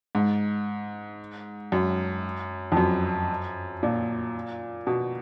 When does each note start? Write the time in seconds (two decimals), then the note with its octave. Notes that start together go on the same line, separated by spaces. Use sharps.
0.15 G#2
1.72 F#2
2.72 F2
2.77 F#2
3.83 A#2
4.87 B2